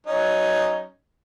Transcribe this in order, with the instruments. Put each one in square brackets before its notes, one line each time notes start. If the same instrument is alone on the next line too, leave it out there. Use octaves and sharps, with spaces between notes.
[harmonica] F#3 C#4 D#4